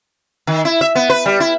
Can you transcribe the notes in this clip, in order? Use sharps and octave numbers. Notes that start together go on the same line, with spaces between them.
D#3
E4
E5
B3
B4
G3
E4